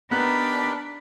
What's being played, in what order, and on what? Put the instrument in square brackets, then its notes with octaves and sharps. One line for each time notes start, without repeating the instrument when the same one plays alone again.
[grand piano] B3 F#6 [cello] D4 [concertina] D#4 G4 A#4 [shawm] B5